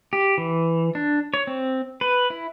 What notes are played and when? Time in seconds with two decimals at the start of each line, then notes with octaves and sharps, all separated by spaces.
0.13 G4
0.38 E3
0.95 D4
1.34 C#5
1.47 C4
2.01 B4
2.30 E4